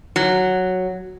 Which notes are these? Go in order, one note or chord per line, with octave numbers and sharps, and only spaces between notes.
F#3